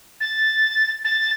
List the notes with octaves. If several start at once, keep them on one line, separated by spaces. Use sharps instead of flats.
A6
A6